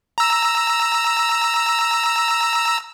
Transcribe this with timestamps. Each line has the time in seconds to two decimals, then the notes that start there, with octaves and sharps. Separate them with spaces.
0.18 A#5 E6